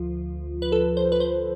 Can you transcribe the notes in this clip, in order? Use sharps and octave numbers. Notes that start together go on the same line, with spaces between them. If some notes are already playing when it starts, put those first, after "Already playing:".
Already playing: D2 F3 F4
B4
A4
C5
B4
C5